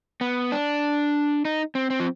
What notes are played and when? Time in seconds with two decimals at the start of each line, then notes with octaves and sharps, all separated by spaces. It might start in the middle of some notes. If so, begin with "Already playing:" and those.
0.21 B3
0.52 D4
1.45 D#4
1.75 C4
1.90 C4
2.00 F3